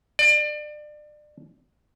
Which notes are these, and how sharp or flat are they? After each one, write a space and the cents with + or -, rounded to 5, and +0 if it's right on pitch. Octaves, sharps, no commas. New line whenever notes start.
D5 +30